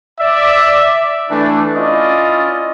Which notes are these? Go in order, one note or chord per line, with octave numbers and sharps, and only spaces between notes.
D5 E5
E3 A3 D4
C#4 E4 F4 D5 D#5